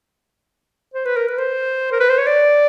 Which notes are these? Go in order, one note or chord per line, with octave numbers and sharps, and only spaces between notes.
C5
B4
A#4
B4
C5
A#4
B4
C5
C#5
D5